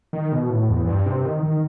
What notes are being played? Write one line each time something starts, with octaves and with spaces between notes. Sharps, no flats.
D#3
B2
A2
E2
G2
C3
D#3
D#3